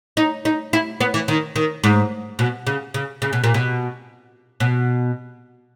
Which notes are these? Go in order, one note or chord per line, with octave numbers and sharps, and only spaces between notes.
D#4
D#4
E4
B3
E3
D#3
D#3
G#2
B2
C#3
C#3
C#3
B2
A#2
B2
B2